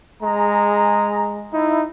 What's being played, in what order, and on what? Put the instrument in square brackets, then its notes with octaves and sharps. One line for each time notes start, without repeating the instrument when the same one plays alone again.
[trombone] G#3 [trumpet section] G#4 A#5
[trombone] D#4 [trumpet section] E4